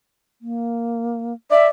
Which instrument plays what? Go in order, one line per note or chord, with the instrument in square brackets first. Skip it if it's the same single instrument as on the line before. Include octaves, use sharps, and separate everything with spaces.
[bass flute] A#3
[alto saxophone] D5 [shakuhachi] E5